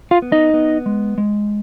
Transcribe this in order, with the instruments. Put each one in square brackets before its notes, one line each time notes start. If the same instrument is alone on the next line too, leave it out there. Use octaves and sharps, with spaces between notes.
[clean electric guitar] F4 F5
B3
D#4 D#5
B3
G#3
G#3